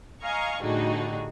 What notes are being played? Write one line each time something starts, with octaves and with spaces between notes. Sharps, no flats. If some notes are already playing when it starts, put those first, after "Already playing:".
D#5 F5 G#5 A#5 C#6
A2 D3 G3 D#4 F#4 G#4